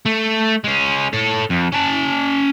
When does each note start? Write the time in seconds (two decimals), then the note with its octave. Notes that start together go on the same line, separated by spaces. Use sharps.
0.06 A3
0.64 G#3 C#4
1.13 A4 C#5
1.50 F2
1.72 C#4 A5